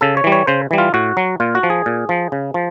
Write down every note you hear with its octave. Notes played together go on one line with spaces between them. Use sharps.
C#3 A4
C#5
E3 G3
C#5
C#3 C5
E3 G3
F4
A2 F#4
F#3
A#2 F4
F#4
F3
G#4
A#2
F3
C#3
F3